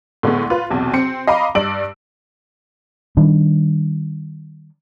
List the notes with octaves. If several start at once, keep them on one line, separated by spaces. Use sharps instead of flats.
A2 D3 G#3 B3
F4 B4
B1 E2 C3
C4 C#7
D#5 F5 A#5 B5 D6
G2 D5 E6 D7 F#7
D#3 G3 D4